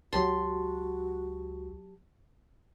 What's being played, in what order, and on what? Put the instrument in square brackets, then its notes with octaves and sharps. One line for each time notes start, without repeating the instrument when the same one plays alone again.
[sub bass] C#2 [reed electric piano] F#3 G4 A5 [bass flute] F#4 [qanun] C6